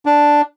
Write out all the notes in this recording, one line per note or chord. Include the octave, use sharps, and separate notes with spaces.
D4